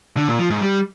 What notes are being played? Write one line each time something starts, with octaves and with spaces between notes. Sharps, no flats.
D3
A#2
F3
G#2
G3